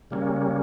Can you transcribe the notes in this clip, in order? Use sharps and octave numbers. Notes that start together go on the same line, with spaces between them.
C#3 G3 A#3 C#4